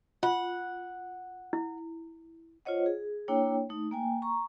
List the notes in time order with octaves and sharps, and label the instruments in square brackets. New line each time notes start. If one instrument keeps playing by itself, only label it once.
[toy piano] F4 [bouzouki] F#5
[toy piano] E4
[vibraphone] F4 C5 C#5 D#5 F#5
G#4
A#3 D4 E4 C#5 G5
A3 D#4
A#3 G5 G#5
A#5 C#6